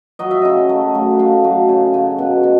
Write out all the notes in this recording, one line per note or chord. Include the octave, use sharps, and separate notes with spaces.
F#3 D#5
E5
C#3 D#5
A3
F#3
A3 F5
F#3
C#3
C#3
B2 F#5
B2